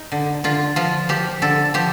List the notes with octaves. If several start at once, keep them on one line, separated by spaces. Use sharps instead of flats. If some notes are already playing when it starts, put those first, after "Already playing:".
Already playing: D#4
D3
D3 F4
F3 F4
F3 G4
D3 A4
F3 G4